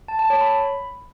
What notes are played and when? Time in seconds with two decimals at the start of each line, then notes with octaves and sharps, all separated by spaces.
0.08 A5
0.19 A5
0.30 C#5
0.41 B5